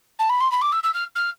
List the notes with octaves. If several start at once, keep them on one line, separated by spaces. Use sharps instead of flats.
A5
B5
C6
B5
D6
E6
E6
F6
F6